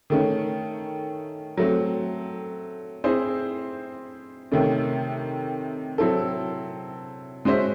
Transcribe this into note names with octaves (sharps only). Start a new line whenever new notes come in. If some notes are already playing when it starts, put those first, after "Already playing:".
D#3 A3 C#4
F#3 A3 C4
C4 E4 G#4 C5
C3 D#3 A3 C#4
F#3 C4 E4 A4
G#3 C#4 F#4 C5 E5